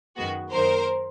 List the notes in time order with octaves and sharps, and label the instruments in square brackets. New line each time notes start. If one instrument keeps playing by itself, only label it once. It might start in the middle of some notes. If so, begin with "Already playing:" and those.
[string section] F#2 D#3 G#3 B3 F#4
F#2 D#3 F#3 A#3 D#4 A#4 C5